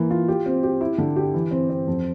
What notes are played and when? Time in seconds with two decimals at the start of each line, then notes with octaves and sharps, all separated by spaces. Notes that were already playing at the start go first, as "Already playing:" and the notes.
Already playing: E3 A#3
0.10 F4
0.28 G4
0.46 C4
0.63 G4
0.81 E4
0.98 D3
1.16 G4
1.34 E3
1.51 C4
1.70 C4
1.87 F2